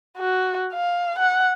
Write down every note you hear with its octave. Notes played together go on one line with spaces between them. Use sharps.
F#4
F5
F#5